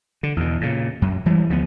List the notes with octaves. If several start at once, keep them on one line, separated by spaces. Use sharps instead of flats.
D3
E2 B2
A#2 C#3
F#2
E3 G3 G#3
D2 F3 G3 B3